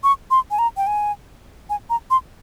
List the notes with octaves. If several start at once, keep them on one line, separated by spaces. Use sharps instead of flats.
C#6
C6
G#5
A#5
G5
G#5
G#5
A#5
C6